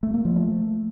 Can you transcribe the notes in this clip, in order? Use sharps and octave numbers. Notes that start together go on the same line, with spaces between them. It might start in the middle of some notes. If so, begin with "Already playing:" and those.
A3
A#3
F3
A3